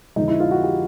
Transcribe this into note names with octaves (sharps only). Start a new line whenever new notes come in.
F2 D3 F3 G#3 D#4
E4
F4
F#4
G4